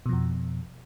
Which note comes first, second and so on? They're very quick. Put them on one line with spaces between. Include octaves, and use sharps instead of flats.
B2 F3 F2